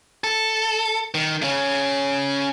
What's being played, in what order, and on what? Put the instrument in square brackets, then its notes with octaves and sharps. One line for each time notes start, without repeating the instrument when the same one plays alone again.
[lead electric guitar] A4
D#3
C#3 C#4